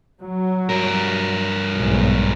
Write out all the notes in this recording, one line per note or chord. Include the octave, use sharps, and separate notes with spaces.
F#3
G2 A#4
B1 G#2